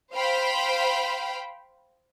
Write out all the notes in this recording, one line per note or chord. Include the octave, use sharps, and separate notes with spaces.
C5 F5 G5 B5